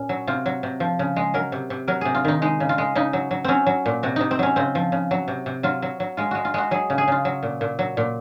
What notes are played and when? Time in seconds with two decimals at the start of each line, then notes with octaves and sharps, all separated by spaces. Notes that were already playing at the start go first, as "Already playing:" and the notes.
Already playing: A#2 C#4
0.09 F#3
0.27 C3 F4
0.46 F#3
0.63 C3
0.80 F3
0.99 C#3
1.16 G#3
1.34 F#3 A#4
1.52 C3
1.70 C3
1.88 F#3 A#4
2.01 C3 G#4
2.15 F4
2.25 D#3 D#4
2.42 G#3 D#4
2.60 C#3
2.69 F4
2.78 G#3
2.95 C#3 D#4
3.13 F#3
3.31 F#3
3.45 F#3 C4 C#4
3.66 F#3
3.86 A#2
4.03 C3 F#4
4.16 C3 D#4
4.31 C4
4.39 F#3 C#4
4.56 C#3 C4
4.75 F3
4.92 C#3
5.11 F#3
5.28 C3
5.46 C3
5.63 F#3 F4
5.82 F#3
6.00 F#3
6.17 G#3 F4
6.31 G#3 F#4
6.45 F4
6.54 G#3 F#4
6.71 F#3 G#4
6.90 C#3
6.98 G#4
7.08 C#3 F4
7.25 F#3
7.43 A#2
7.61 A#2
7.79 F#3
7.97 A#2